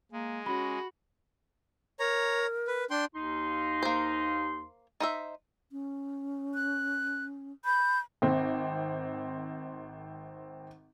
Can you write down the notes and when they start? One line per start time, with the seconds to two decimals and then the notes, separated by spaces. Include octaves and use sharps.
0.12 G#3 A#3
0.46 C#4 F#4 B5
2.00 A#4 C#5 A#5
2.67 B4
2.90 D4 G5 C6
3.15 D#2 D#4 C6
3.83 A#3 C5
5.00 D#4 C5 E5
5.72 C#4
6.55 F#6
7.65 B5 G6
8.22 G#1 C4